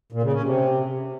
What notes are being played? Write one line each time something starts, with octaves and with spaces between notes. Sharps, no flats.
A#2
C#3
C#4
C3